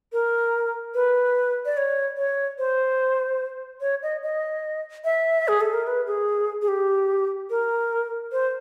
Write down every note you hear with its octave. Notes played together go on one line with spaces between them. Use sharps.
A#4
B4
D5
C#5
C#5
C5
C#5
D#5
D#5
E5
G#4
A4
A#4
B4
G#4
G#4
G4
A#4
C5